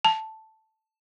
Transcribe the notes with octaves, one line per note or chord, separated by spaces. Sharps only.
A5